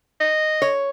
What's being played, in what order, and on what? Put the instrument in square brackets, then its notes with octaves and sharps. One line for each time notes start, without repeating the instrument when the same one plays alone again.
[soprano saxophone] D#5
[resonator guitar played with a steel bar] C#5